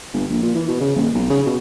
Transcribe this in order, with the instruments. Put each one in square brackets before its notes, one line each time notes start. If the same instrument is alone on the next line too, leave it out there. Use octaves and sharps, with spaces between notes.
[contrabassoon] G1
A#1
A#2
E3
B2
C#3
D#1
B1
C#3
B2